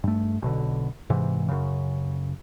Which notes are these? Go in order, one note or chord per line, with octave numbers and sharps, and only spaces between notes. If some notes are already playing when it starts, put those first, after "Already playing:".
G2 A3
B1 B2 D3
G#2 C3 E3
F#2 C#3